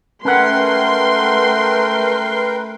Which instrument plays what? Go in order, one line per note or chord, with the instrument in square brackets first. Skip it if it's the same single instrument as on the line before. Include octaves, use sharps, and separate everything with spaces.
[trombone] A3 [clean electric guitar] C#4 F#5 [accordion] A#4 B4 G5 [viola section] C6